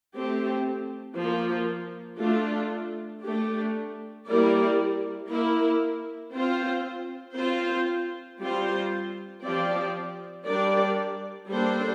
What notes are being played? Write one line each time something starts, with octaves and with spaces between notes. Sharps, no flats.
A3 C4 G4
F3 A#3 F4
A3 D4 F4
A3 D4 G4
G3 A#3 E4 A#4 D5
A#3 E4 A#4
C4 F4 C5
C4 F4 C5
G3 C4 F4 C5
F3 C4 G4 D5
G3 D4 G4 A#4 D5
G3 A#3 D4 A4 C5